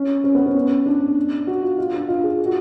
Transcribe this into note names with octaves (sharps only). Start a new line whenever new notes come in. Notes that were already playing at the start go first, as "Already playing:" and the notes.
Already playing: C#4
C#4
B3
C#4
D4
F#4
F4
F4
D4
F4
G#4
F#4